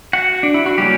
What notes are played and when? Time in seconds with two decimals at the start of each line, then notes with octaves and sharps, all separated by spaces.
0.13 F#4 F#5
0.43 D4
0.54 E4
0.66 F#4
0.78 C#3 F#3 G3 A#3 C#4 G4